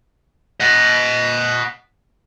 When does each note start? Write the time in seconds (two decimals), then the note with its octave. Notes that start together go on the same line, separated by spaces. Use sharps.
0.60 D#5 F#5